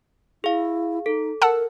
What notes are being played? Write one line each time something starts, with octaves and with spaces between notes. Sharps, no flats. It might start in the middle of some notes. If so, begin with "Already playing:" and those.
E4 G#4 F5
D#4 A4
A#4 F#5 A5 E6